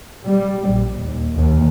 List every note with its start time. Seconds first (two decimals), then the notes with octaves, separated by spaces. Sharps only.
0.24 G3
0.68 A#1
1.00 D#2
1.35 D#2